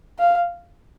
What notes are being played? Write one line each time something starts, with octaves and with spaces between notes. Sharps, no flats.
F5